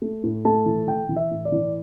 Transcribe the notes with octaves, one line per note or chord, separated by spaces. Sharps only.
A3
A2
A3 A5
E3
E3 G5
E3
E5
A2
D5
E3